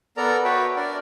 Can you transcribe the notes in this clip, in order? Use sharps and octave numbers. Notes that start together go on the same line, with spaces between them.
B3 A4 A#4 D5 A#5
F#4 B4 C#5 E5 G5
D4 A#4 D5